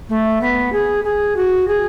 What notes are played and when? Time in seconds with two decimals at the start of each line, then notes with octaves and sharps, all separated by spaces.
0.09 A3
0.41 B3
0.72 G#4
1.04 G#4
1.36 F#4
1.67 G#4